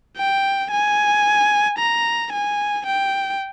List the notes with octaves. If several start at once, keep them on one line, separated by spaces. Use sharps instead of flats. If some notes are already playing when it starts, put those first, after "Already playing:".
G5
G#5
A#5
G#5
G5